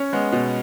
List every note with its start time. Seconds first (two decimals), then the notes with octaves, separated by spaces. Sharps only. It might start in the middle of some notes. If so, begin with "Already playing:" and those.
Already playing: C#4 C#5
0.13 G#3 B3
0.33 B2